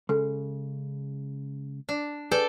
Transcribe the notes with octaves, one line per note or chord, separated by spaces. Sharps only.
C#3 G#3 A4
D4
G#4 A4 B4 D5 G5